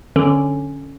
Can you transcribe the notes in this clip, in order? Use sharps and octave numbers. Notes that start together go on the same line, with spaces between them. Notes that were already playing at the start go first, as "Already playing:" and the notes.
D3 C#4